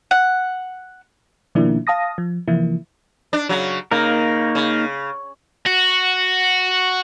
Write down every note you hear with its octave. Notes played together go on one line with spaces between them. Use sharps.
F#5
B2 D#3 F3 A#3 D4 E4
F5 A5 D#6 A#6
F3
C3 E3 F3 A#3 E4
D4
C#3 F#3
C#3 A#3 D#4 A#4
C#3
F#4